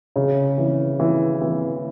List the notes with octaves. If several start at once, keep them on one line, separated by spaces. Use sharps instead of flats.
C#3
E3
E3
E3